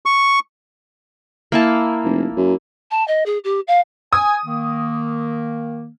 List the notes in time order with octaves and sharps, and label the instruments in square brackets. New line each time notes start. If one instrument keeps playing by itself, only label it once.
[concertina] C#6
[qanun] A#3 E4 A5
[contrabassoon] F1
F#2
[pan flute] A5
D#5
G#4
G4
F5
[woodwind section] G#5 [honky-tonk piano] D#6
[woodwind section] D#3 A#3